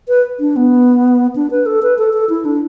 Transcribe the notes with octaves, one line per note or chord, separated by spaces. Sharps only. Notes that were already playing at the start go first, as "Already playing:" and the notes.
B4
D4
B3
D4
B4
A4
B4
A4
A4
E4
D4